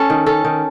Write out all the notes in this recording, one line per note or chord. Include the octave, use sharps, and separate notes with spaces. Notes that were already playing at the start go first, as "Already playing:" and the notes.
Already playing: C#4 A4
D#3
C#4 A4
D#3